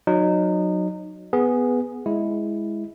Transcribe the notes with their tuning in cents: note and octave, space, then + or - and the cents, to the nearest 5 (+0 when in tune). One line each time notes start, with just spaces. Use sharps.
F#3 -15 D#4 -25
B3 +5 G#4 +0
G#3 +0 E4 +0